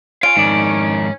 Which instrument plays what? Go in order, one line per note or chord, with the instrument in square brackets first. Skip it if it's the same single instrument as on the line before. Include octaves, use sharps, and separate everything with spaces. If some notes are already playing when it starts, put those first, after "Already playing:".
[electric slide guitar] F4 [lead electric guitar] C#5 G#5 [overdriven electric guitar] F5 [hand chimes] D7
[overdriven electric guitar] F2 D#3 [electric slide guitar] G#2 D5